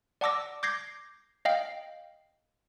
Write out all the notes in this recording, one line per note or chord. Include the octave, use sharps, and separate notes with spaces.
D5 F#5 A5 D6 E6 A#6
D6 G6 G#6 A#6 C7
D#5 F5 G5